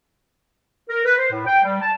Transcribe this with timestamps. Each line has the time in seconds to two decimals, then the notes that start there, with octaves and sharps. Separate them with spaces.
0.89 A#4
1.06 B4
1.19 C5
1.31 A2
1.47 G5
1.64 G3
1.82 A5